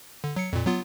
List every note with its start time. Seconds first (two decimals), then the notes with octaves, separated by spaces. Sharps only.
0.24 D3
0.36 F#3 C#7
0.53 F2 A#2
0.67 F#3 B3 F4